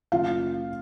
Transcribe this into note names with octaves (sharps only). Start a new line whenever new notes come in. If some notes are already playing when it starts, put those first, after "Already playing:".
F#1 F4 F5